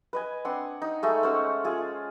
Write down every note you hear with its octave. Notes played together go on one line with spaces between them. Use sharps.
B4 D#5 G#5
C4 D4 F#5 C6
D#4
G#3 A3 D#4
C#4 C5 F#5 E6
F4 G#4